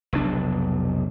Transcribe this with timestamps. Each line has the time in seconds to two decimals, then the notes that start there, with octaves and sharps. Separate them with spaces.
0.13 F1 B1 D4